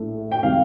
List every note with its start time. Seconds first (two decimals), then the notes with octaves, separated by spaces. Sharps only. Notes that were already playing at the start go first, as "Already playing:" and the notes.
Already playing: A#1 A2 A3
0.32 G5
0.43 C3 D#3 G3 F5